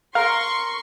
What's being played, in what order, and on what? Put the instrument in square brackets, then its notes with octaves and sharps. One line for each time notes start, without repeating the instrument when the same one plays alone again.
[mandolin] A#4 [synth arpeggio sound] F5 [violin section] C6 C#6